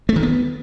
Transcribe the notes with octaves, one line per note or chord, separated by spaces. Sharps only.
A3
D#3
B3